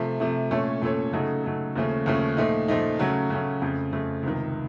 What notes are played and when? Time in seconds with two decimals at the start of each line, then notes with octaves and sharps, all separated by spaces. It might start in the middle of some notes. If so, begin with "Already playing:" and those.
Already playing: C3 F3 A3
0.20 C3 F3 A3
0.51 A#2 A3 C#4 A4 C#5
0.82 A#2 A3 C#4 A4 C#5
1.13 C#3 F#3 A3 D#4 A4
1.44 C#3 F#3 A3 D#4 A4
1.76 D#2 C#3 F3 A3 C#4
2.06 D#2 C#3 F3 A3 C#4
2.37 A#2 F3 A3 D#4
2.68 A#2 F3 A3 D#4
2.99 C#3 F#3 A3 C#4
3.30 C#3 F#3 A3 C#4
3.62 F2 C#3 A3
3.93 F2 C#3 A3
4.23 C#2 C3 D#3